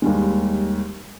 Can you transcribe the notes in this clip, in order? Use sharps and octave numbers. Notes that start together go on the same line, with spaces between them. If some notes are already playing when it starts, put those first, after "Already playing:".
D#2 G3 G#3